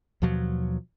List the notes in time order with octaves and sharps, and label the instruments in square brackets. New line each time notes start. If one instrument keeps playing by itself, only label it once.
[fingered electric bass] D#2 B2 F3 F#3